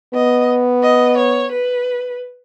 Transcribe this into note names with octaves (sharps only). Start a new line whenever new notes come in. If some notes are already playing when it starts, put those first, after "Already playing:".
B3 D#5
D#5
C#5
B4